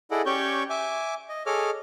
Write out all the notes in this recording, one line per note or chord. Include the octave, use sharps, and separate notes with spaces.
E4 G#4 A4 D5 D#5 F#5
C#4 G4 C#5 D5 C#6 G6
E5 G#5 D6
D#5
G#4 A4 C#5 D#5 D6 F6